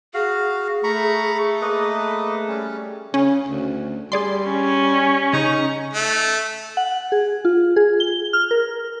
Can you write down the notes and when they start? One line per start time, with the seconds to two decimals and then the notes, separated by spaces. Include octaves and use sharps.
0.14 F#4 G#4 F5
0.84 A3 A#5 B5 C#6
1.62 A#3 B4 D#5
2.48 G3 C#4
3.14 C#3 C#4
3.49 D2
4.12 G3 G#4 D5 C6
4.48 C#4
5.33 C#3 D#4
5.93 A3
6.77 F#5
7.12 G#4
7.45 F4
7.76 G#4
8.00 G7
8.33 F6
8.51 A#4